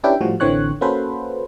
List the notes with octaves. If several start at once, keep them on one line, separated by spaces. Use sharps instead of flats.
C#4 D4 E4 G4 B4 G5
A2 F3 G3 F#4
A1 D3 E3 C4 C#5 F#6
A#3 C#4 F#4 A4 B4 C5